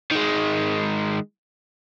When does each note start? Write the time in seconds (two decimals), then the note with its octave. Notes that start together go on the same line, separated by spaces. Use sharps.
0.11 D#3 G#3